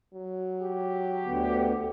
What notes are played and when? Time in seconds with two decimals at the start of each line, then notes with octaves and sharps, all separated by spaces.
0.14 F#3
0.61 G4
1.25 D2 D3 B3